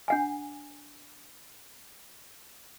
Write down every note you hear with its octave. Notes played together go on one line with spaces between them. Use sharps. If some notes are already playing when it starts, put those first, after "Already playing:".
D4 F#5 G#5